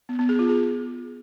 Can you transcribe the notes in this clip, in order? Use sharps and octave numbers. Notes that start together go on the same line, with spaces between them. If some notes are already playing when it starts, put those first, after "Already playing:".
B3
B3
G#4
F4
G#4